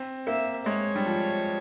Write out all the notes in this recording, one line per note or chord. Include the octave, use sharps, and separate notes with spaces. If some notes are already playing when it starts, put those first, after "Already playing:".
Already playing: C4
A#3 E5
G#3 C#5
G3
F3